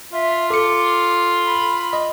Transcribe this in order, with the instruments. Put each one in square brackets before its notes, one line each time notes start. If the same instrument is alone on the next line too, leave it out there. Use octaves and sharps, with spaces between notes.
[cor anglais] F4 [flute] E5
[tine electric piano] A4 C#7 [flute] D6
[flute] B5
[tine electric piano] D#5